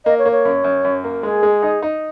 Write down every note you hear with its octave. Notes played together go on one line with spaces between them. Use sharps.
A#3 D#5
C#5
A#3
C#5
F#2
F#2
F#2
A#3
G#3 G#4
G#3
D#4
D#4